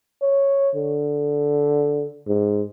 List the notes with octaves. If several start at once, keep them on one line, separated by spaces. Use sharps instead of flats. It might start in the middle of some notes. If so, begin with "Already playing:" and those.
C#5
D3
G#2